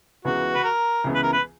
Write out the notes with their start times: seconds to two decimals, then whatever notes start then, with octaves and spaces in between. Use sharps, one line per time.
0.25 C#2 C#3 E3 B3 F#4
0.55 B4
0.64 A#4
1.04 C#2 C#3 E3 B3
1.15 B4
1.23 A#4
1.33 B4